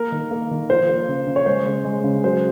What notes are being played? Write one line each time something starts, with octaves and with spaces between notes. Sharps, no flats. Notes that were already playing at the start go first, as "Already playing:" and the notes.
Already playing: A#3 A#4
D#3
A#3
D#3
F3 C5
A#3
C#3
C#3
C#5
G#3 C5
C#3
G#3
C#3
F#3 C5